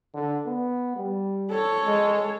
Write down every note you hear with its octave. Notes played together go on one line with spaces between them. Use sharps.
D3
B3
G3
A4 C#5
G#3